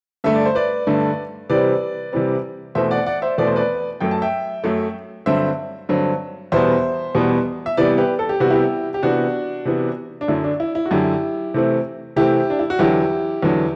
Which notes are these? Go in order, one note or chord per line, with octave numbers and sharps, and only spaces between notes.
G2 D3 A3 E5
D5
C5
B4 D5
G2 D3 A3
C3 E3 G3 C4 B4 D5
C3 E3 G3 C4
E2 B2 A3 C4 C5 E5
D5 F#5
D5 F#5
C5 E5
E2 B2 A3 C4 D5
C5
B4 D5
F#2 F#3 A3 G5
A5
E5 G5
F#2 F#3 A3
G2 D3 F#3 C4 C5 E5
G2 D3 F#3 C4
E2 B2 G3 B3 C5 E5
E2 B2 G3 B3
E5
C3 E3 G3 B3 B4 D5
G4 B4
A4
G4
C3 E3 G3 B3 F#4
E4 G4
G4
C3 E3 B3 D4 F#4
C3 E3 B3
D4
F#2 D3 F#3 E4
D4
E4
E4
F#4
F#2 D3 F#3 E4 G4
C3 E3 A3 C4
C3 E3 A3 C4 E4 G4
D4
E4
F#4
E2 D3 F#3 E4 G4
E2 D3 F#3